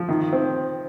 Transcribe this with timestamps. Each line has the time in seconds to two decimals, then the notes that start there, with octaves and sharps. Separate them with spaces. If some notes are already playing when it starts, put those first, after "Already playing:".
Already playing: F3
0.09 D#3
0.33 C4